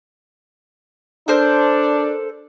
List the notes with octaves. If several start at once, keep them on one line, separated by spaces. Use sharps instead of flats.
D4 A4 A#4 C5